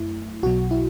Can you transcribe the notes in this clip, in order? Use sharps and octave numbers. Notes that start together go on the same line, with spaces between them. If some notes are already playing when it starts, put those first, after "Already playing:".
Already playing: F#2 A3 E4
B1 B2 F#3 F#4
E4